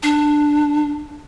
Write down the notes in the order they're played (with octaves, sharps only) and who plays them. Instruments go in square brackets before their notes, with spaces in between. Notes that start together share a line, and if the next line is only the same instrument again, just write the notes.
[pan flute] D4